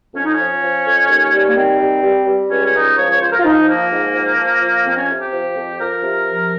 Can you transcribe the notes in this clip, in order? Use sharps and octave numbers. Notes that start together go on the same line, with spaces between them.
F2 C#4
D#4
F3 C#4
F3
F2
D#2
G3
A#3
D#3 C4
G3
G3
G3
C#2 C#4
C#4
C#2 D#4
F3 C#5
C#5
F3 C5
A#4
F4
F3 D#4
F3 A#3
G#2
F3
F3
F3
F2 C4
C#4
C3
G4
F3
F2
F3 A#4
C3
F3